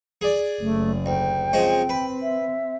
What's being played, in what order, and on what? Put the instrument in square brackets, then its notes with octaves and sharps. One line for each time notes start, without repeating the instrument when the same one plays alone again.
[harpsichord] G#4 D5
[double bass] F#1 [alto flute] A3
[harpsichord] D2 [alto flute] G5
[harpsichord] F3 G#3 C#4 [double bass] C4
[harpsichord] B4
[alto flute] E5